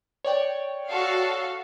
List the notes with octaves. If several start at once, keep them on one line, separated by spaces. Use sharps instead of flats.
C#5 D5 G5
F#4 A4 F5